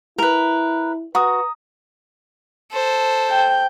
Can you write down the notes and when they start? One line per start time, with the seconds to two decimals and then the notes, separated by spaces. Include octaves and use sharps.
0.18 E4 A#4 B4
1.15 F#4 B4 A#5 D#6
2.72 A4 C5
3.30 G5